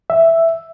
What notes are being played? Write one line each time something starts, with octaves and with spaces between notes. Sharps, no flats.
E5